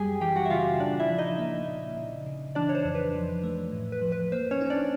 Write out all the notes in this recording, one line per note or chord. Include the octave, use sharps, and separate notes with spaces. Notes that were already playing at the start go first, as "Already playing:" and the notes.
Already playing: F#2 G3 G4 G#4 G5 G#5
E3 G4 G5
F#4 F#5
E5
C#3 F4 F5
A#2 D4 D5
E4 E5
F3
D#4 D#5
A#3
A#2
C#3
C#3
E3 D4 D5
C#5
C5
F2
B4
F3
A3
A2
B4
F3
B4
A#3 C5
C#4 C#5
D#4
D4 D5